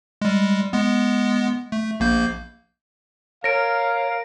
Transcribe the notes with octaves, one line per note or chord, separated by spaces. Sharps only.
G3 G#3
G#3 B3
A3
A#1 A#3 G6
A#4 C#5 F5 A#6 D7